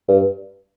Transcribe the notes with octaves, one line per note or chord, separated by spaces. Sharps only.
G2